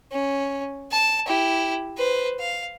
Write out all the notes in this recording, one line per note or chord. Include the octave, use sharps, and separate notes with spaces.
C#4
A5
E4 G4
B4 C5
F5